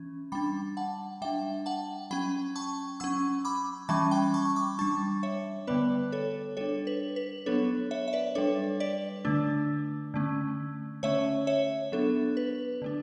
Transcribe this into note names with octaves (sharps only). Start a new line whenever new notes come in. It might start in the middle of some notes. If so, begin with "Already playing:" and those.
Already playing: E3 C#4
G3 D4 G5 B5
F#5 A5
G3 D4 E5 G5
F#5 A5
F#3 C#4 G5 B5
A5 C#6
F#3 C#4 C#6 E6
B5 D6
E3 G3 C#4 A5 C#6
G5 B5
A5 C#6
C#6
B5 D6
G3 D4 A5 C#6
C#5 E5
D3 G3 B3 B4 D5
A4 C#5
G3 D4 A4 C#5
B4
B4
F#3 B3 D4 A4 C#5
C#5 E5
E5
B4 D5
G3 D4 A4 C#5
B4 D5
D3 A3 D4
D3 A3 C#4
D3 A3 C#4 C#5 E5
C#5 E5
F#3 B3 D4 A4
B4
D3 A3 D4